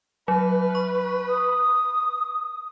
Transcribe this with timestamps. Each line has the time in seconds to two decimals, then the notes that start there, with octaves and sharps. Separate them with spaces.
0.28 F#3 B4 E5 F6
0.75 C#6
1.29 D#6